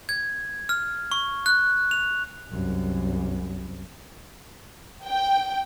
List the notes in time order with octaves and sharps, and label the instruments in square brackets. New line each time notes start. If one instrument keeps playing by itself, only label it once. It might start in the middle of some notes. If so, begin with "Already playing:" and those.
[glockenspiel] G#6
F6
C#6
F#6
F7
[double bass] C2 F#2
[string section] G5